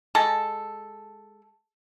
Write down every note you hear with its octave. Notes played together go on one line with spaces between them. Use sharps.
G#3 A4